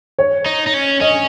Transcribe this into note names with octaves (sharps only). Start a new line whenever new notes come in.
C#5
D#4
D#4
C#4
C#4 D#5